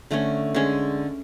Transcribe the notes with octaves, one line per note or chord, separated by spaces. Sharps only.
D3 A3 C#4
D3 G#3 C#4